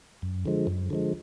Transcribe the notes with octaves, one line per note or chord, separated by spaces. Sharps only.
F#2
D3 F3 G#3
F#2
D3 F3 G#3